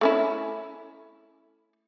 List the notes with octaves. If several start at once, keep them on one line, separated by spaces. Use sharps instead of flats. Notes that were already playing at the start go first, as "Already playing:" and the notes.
A3 C#4 E4